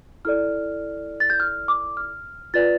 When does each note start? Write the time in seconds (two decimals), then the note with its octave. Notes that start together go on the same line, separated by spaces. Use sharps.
0.25 E4 A4 D5 F6
1.20 A6
1.30 G6
1.40 F6
1.68 D6
1.97 F6
2.54 F4 B4 D5 A6